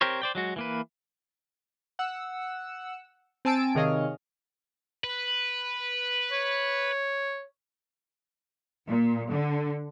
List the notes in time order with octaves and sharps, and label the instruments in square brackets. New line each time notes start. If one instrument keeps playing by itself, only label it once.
[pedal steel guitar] C4 G4 A#4 C5 C#5
C5 D5 G5
F#3 G#3 F#4
E3 A#3 B4
[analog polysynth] F#5 E6
C4 G#5 A5 E6 D7
C3 D#3 G#4 C#5 D#5 F5
[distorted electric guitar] B4
[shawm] C#5
[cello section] A#2
D3